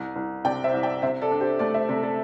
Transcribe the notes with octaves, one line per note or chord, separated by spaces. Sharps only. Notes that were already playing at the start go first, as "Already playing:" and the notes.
Already playing: C2
C2
C3 D5 G5
C5 E5
C2
D5 G5
C3 C5 E5
A4 D5
D4
G4 C5
A3 A4 D5
C5 E5
C3 A4 D5
A4 D5